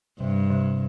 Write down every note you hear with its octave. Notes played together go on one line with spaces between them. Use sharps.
G2 C3
C3